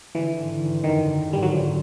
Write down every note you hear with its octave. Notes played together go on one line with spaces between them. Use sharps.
D3 E3
G#1
G#1
F#2 D#3
D3
G#1 G3
F#3
G#1 F3